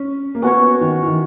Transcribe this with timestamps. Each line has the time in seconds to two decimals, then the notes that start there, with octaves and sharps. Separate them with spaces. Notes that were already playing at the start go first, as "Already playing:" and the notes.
Already playing: C#4
0.35 A#3
0.42 B3 C#4 F#4 C#5
0.81 D#3
1.02 E3
1.07 D#3